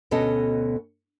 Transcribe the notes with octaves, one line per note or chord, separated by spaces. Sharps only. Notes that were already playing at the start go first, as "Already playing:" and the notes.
D2 B2 C#4 A4 D#5